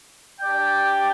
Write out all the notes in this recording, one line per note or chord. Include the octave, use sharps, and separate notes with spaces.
D4 G4 D5 G5